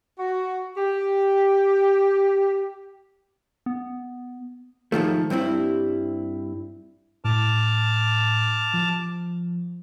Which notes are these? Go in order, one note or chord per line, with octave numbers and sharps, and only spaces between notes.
F#4
G4
B3
G#2 D#3 F3 A3
G2 G3 C4 E4
A2 A5 D6 F6
F3